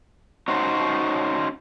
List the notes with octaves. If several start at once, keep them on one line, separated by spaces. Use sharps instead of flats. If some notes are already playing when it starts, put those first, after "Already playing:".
C#4 D#4 F#4 C5 C#5